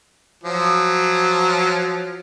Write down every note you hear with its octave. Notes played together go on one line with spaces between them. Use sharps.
F3 F#3